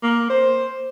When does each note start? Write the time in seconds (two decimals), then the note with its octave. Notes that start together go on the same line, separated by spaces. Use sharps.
0.03 A#3
0.29 C5